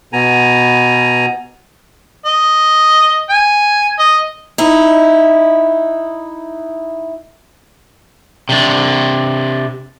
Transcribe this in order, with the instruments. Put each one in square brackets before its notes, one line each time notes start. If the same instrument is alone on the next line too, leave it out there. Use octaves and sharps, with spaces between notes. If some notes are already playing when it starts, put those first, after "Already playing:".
[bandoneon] B2 B3 G#5 A#5
[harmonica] D#5
G#5
D#5
[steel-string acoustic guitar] D#4 E4
[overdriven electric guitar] C3 D4